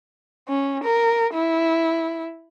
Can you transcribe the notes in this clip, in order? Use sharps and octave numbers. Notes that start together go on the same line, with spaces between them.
C#4
A#4
E4